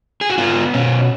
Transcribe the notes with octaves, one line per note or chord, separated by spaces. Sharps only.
G#4
F#4
B3 F4
B2 C#4